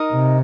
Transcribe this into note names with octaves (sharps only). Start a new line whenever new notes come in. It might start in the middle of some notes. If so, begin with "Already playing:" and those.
Already playing: D#4 A#4 D#5
C3